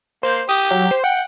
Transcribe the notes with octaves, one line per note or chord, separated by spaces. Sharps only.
A#3 C5
G4 D#6
F#3
C5
F#5 G5